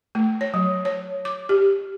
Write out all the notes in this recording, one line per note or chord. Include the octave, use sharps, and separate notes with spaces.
A3
C#5
F#3
C#5
D6
G4